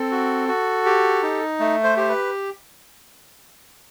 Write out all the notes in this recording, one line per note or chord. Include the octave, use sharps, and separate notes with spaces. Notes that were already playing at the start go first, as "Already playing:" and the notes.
Already playing: C4 A4
F#4
F#4
G4
D#4
A3
C5
G4 C5
B4